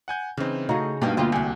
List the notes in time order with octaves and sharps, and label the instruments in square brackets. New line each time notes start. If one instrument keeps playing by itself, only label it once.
[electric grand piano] F#5 G#5 G6
[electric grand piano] C#3 C4 [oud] E3 D#4
[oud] C#3 G#4 [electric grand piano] A3 [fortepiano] D#4 F#4 A#5
[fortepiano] G2 [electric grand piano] B2 [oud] A#3 B3 D#4
[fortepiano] D2 [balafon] A#3 [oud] B3 D4 F4
[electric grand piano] C2 [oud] F#4 G4 [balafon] G#5